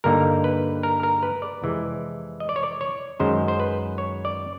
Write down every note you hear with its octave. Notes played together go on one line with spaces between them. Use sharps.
G2 D3 G3 A#3 D#4 A#4
B4
A#4
A#4
B4
D5
F2 C3 E3 G#3
D#5
D5
C#5
D5
C#5
F#2 D#3 G#3 C#4 C5
C5
B4
C#5
D5